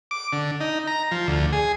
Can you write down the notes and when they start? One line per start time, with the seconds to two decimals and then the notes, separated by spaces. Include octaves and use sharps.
0.11 D6
0.33 D3
0.61 D#4
0.87 A#5
1.11 F3
1.27 D2
1.53 G#4